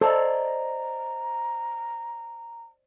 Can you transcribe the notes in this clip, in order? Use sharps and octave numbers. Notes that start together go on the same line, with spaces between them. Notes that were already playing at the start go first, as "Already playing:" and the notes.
A4 C5 D5 D#5 A#5